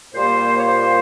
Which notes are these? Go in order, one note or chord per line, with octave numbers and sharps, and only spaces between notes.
A#2 G3 A#3 F4 C5
C#5
C5